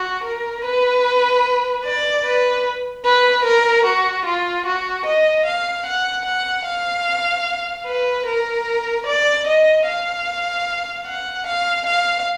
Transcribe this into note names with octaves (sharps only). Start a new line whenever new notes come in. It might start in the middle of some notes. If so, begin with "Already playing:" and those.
Already playing: F#4
A#4
B4
D5
B4
B4
A#4
F#4
F4
F#4
D#5
F5
F#5
F#5
F5
B4
A#4
D5
D#5
F5
F#5
F5
F5